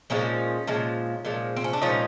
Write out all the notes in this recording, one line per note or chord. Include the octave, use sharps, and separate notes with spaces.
A#2 F3 G#3 C#4 D#4
A#2 F3 G#3
A#2 F3 G#3
C4
C#4
D4
A#2 F3 G#3 C#4 D#4